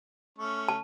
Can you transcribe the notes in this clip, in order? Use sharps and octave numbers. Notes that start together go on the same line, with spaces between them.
A3 C#4 C#6
A5